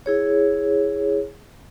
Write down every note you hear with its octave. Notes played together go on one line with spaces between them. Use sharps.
E4 G#4 C#5